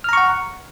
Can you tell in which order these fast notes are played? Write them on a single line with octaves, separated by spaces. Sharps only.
F6 A#5 C#6 F#5